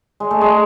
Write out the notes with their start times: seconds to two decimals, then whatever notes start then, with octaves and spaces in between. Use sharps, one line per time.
0.20 G#3
0.31 A3
0.41 G#3